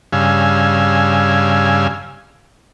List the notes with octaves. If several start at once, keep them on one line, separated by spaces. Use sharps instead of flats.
G2 C#3 F5 G#5 E6